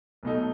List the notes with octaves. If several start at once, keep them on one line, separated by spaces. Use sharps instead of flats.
B1 B2 A3 D#4